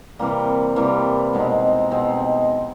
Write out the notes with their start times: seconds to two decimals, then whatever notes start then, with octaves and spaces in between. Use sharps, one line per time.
0.19 C3 E3 G3 A#3
0.76 C3 E3 G3 A#3
1.33 B2 G#3 C4 D#4
1.91 B2 G#3 C4 D#4